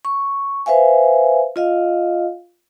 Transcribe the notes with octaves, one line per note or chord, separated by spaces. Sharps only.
C#6
B4 C5 E5 F5 G#5
F4 D#5 F5